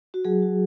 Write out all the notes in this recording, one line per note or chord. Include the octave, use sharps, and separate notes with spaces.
F#4
F#3 G#4
F#4